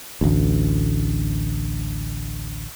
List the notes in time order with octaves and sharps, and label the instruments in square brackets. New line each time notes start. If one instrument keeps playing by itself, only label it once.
[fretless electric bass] A1 D2